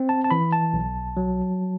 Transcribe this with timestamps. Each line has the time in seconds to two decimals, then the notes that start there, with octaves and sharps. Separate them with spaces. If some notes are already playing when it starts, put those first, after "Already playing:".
Already playing: C4
0.09 A5
0.24 A5
0.31 E3 B5
0.52 A5
0.74 B1
1.17 F#3